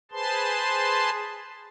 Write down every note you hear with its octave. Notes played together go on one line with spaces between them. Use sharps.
G#4 B4 C5 A5 C6